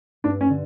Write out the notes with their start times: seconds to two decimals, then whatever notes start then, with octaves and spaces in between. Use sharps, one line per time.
0.24 G2 D4
0.41 C#4
0.50 D3